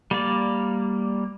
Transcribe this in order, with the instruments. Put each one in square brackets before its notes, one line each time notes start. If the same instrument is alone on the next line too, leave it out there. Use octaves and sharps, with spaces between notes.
[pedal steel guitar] G3 A#3 D5